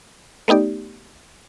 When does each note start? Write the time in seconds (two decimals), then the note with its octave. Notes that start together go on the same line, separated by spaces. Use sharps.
0.48 A3 B3 D#4 G4 D5